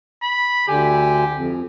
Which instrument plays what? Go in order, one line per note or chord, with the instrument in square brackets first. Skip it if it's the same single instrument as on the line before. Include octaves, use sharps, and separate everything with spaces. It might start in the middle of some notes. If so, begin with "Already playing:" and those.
[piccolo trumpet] B5
[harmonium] D2 D3 G#5 [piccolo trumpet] G4
[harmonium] F2